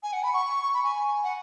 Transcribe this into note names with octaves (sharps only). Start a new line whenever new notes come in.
G#5
F#5
B5
C#6
B5
G#5
F#5